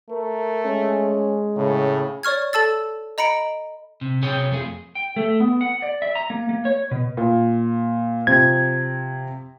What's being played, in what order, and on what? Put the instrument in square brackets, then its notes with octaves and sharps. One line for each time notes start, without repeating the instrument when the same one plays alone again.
[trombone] A3 [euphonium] A#4
[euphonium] G#3 [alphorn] C#4
[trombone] A2 [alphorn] C#3
[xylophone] C#5 D5 C#6 F6 G#6
A4 A5 E6 A6
D#5 A#5 B5 C#7 D7
[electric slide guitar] C3
C3 G#4 C#5 G5
F2 A3 G#4
G5
A3
B3
F#5
D5
E5
A#5
A#3
A#3
C#5
B2
[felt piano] A#2
[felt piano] C3 F3 C4 [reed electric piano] G#6